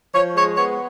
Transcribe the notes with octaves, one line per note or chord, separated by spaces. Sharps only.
F3 C#5
G#3 C#5
B3 C#5